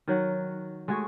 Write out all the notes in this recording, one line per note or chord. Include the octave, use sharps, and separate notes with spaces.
D#3 F#3 F#5
G#3 A3 F#4 G#4